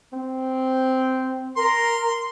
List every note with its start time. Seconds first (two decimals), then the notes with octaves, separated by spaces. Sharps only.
0.13 C4
1.57 A#4 A#5 C6